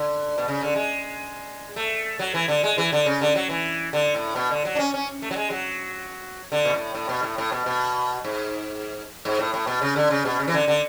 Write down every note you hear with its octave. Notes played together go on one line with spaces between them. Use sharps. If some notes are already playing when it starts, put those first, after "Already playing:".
Already playing: D3
B2
C#3
D3
G#3
A3
F#3
E3
D3
G#3
E3
D3
C#3
D3
F#3
E3
D3
A2
B2
D3
F#3
D4
C#4
C#4
A3
F#3
G#3
F#3
D3
B2
A2
A2
B2
A2
A2
B2
B2
G#2
G#2
A2
A2
B2
C#3
D3
C#3
B2
C#3
E3
D3
D3